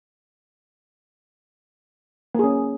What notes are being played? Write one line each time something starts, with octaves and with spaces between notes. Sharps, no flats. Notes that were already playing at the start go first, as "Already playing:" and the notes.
A#3 C#4 G#4